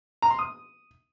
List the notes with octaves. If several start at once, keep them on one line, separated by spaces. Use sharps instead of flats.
A#5
C6
D#6